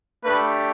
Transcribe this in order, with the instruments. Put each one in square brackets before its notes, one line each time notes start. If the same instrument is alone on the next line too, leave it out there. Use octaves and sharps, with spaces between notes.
[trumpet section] A3 D4 G4 B4